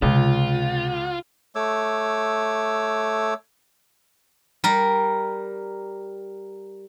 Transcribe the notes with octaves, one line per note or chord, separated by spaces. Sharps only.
C#2 C3 F4
A3 C#5 D6 E6
G3 A#4